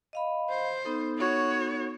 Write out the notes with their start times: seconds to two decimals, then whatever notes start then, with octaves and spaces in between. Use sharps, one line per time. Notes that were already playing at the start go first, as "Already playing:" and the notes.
0.13 D#5 F5 B5
0.49 C5
0.85 B3 D#4 A4
1.18 F#4 C#5